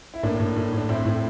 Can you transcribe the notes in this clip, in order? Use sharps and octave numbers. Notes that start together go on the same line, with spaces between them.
E4
A2 A#3 D4
A2
A2
A2 D4
A2 C4 E4
A2